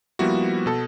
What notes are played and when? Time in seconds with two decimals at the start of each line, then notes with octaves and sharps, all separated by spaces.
0.19 F3 G3 A#3 B3 E4 F#4
0.66 B2 A4